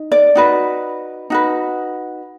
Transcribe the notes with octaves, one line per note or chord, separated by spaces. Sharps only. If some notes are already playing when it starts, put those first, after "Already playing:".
Already playing: D#4
D5
D#4 F#4 B4
D#4 F#4 B4